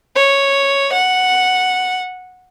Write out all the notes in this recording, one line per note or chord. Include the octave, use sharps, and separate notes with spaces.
C#5
F#5